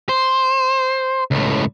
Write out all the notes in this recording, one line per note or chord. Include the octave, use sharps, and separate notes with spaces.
C5
C#2 A2